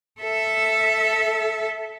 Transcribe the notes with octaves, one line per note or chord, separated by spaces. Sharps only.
A4 E5